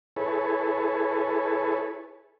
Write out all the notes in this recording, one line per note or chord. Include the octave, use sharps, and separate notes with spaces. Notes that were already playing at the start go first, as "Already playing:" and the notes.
E4 G#4 A4 B4 C#5